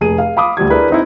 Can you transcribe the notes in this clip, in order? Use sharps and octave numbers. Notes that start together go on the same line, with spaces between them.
F1 G#4 D#7
F5
F5 B5 D6 D#6
D2 G3 G4 G#6
D4 E4 G#4 A#4 B4
C4 D#4 E4